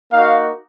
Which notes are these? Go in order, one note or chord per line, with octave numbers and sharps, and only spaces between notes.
A#3 D#4 F#4 F5